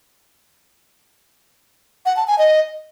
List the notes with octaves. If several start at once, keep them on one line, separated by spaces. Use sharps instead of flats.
F#5
A5
G#5
D#5